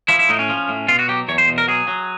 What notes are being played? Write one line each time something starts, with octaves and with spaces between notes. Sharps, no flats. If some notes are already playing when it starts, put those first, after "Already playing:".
F3 E4
E4
A2 D#4
C#4
F3
A2
B2 F4
F#4
F#3 G4
E2 C#5
C5
B2
A#4
F#3 G#4
F#3